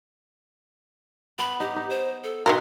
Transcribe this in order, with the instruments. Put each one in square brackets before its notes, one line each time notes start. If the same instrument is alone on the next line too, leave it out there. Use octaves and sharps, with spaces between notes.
[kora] B3 [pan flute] B5
[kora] D#4 [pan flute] G4
[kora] D#4
[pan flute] C5
A4
[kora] B2 E5 F#5 [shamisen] D#3 E3 A#4 [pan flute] C6